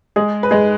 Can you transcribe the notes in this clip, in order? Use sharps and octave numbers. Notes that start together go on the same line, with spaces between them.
G#3 G#4
B4
G#3 G#4